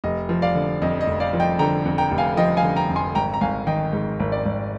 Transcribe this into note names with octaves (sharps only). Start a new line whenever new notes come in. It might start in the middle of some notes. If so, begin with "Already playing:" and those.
F1 D#5
F3
D5 F5
D3
F2 D#5
D#5
F1
D5 F5
F3
D#5 G5
D3 G5 A#5
F2
G5 A#5
F1
F5 G#5
F3 D#5 G5
F5 G#5
D3
G5 A#5
F2
G#5 C6
G#1 G5 A#5
A#5
G#1 F5 G#5
D#3 D#5 G5
G#2
G#1
D5
G#1